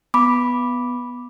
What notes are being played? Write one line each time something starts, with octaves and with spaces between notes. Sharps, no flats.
B3 B5 D6